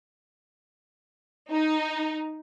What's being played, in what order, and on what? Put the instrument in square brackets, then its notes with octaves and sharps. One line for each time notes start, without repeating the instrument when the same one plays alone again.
[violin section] D#4